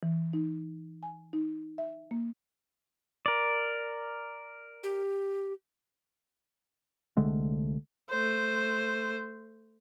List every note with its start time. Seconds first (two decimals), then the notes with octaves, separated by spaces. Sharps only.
0.03 E3
0.33 D#4
1.03 G#5
1.33 D#4
1.78 E5
2.11 A#3
3.26 A#4 D5
4.83 G4
7.17 C2 D3 G#3 A3
8.10 A3 C5